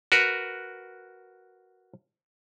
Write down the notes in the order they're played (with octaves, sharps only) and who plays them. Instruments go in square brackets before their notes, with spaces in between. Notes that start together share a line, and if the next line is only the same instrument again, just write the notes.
[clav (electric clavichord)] F#4 A#4 B4